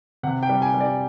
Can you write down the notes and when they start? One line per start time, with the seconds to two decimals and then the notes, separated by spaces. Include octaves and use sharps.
0.23 C3 F#5
0.43 G5
0.49 G3
0.62 G#5
0.74 G3
0.81 D5